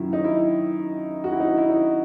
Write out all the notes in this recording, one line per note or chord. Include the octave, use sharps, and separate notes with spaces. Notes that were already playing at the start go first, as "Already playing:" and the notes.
Already playing: F#2 D#3 F#3 E4
D#4
E4
F#4
E4
D#4
E4
D#4